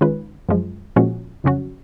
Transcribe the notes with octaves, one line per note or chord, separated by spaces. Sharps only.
D#3 G#3 C#4 F4 B4
F#2 F3 G#3
A#2 F3 G#3 C#4 F#4
F2 C#3 F#3 C#4 F#4